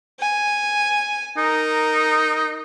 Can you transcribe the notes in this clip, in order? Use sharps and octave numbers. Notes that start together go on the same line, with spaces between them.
G#5
D#4 A#4